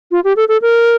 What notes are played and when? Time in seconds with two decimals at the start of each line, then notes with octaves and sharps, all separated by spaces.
0.11 F4
0.24 G4
0.36 A4
0.48 A4
0.62 A#4